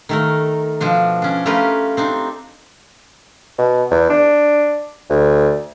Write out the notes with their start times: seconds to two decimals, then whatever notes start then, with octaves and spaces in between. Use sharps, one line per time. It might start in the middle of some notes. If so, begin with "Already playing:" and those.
0.09 D#3 A3 A#4
0.80 B2 F3 D4
1.22 C#4 D4
1.46 A3 C#4 F4 G4 A#4 B4
1.97 C4 D4 D#4
3.58 B2
3.91 E2
4.09 D4
5.10 D2